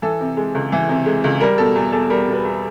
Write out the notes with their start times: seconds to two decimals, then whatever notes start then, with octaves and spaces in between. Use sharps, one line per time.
0.02 E3 A4
0.21 C3
0.37 G#3
0.55 C#2
0.72 E3
0.89 C3
1.06 G#3
1.24 C#2
1.41 G3 A#4
1.58 B2 A4
1.75 E2
1.92 E2 A4
2.10 G3 A#4
2.28 B2
2.33 B4
2.45 E2